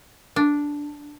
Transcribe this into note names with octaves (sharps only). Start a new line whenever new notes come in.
D4